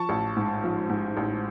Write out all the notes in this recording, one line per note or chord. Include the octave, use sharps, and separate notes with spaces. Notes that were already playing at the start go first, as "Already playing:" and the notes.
Already playing: F3 A5 C#6
A1
G#2
F3
G#2
A1